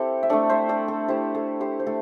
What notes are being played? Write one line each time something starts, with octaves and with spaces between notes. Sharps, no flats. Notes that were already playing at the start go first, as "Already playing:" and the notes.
Already playing: C4 E4 G4 A4
E5
A3 D4 A4 D5
C5 E5
A4 D5
A4
A3 E4 G4 C5
A4
G4 C5
C5
A3 A4